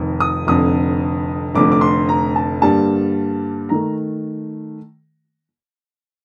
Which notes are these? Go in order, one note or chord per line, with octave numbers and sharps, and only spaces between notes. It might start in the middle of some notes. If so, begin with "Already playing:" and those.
Already playing: F1 F2 D#3
D#6
F1 F2 D3 D#6
F1 F2 D3 A3 D6
D6
C6
A#5
A5
G2 D3 G3 A#3 A5
D#3 A3 A#5